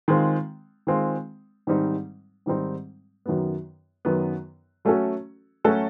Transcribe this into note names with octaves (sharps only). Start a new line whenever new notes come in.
D#3 G#3 C4 F4
D#3 G#3 C4 F4
G#2 D#3 G3 C4 D#4
G#2 D#3 G3 C4 D#4
F#2 D#3 F#3 B3
F#2 D#3 F#3 B3
F#3 A3 C#4 F#4 A4
F#3 A3 C#4 F#4 A4